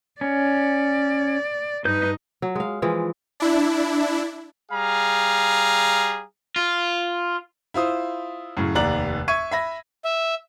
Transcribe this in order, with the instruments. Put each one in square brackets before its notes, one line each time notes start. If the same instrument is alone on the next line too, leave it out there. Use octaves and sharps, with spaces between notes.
[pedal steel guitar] C#4 [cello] D5
[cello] G2 D#4 [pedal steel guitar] B4 G6
[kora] F#3
G#3 F5
E3 F3 G#3
[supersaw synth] D4 E4
[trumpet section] G3 G#4 F5 A#5
[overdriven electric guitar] F4
[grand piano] E4 F4 C5 D#6
F#2 A2 C#3
F1 D#2 D5 A#5 F#6 F#7
E5 C#6 G#6 D#7
E5 B5 A#6
[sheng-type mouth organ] E5